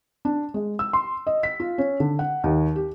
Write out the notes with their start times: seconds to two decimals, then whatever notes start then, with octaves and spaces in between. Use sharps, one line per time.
0.25 D4
0.54 G#3
0.79 E6
0.93 C6
1.27 D#5
1.43 B6
1.60 F4
1.78 C#4
2.00 D3
2.19 F#5
2.44 D#2
2.76 G4